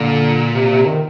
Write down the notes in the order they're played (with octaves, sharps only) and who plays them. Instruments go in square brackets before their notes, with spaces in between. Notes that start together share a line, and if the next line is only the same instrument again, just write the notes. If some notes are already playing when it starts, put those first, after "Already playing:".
Already playing: [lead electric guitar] A#2 [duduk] D3
[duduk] C3
C3
D#3